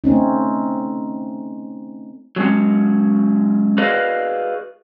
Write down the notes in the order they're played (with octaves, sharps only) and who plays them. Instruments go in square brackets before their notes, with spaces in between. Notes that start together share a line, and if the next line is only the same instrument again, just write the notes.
[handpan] A3 C4 C#4 D#4
[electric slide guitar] F#3 G#3 C#4
F#4 G#4 B4 D5 D#5 F5